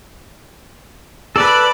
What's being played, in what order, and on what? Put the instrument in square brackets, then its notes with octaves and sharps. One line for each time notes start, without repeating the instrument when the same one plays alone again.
[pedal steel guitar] A4 B4 [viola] D5 B5